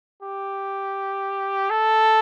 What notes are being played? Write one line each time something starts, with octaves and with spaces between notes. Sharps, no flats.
G4
A4